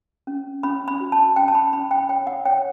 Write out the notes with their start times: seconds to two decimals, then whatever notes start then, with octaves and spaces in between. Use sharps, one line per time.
0.27 C#4
0.63 C#4 B5
0.88 B5
1.00 F#4
1.12 A5
1.36 C#4 G5
1.48 A5
1.55 B5
1.73 C#4 B5
1.91 G5
2.09 C#5 G5
2.27 F#5
2.45 C#5 G5